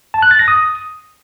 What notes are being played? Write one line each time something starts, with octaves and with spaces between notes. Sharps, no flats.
A5
F#6
A6
A#6
D#6